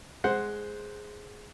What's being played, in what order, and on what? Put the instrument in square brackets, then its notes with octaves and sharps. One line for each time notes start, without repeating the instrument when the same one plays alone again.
[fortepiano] G#3 C5 F#5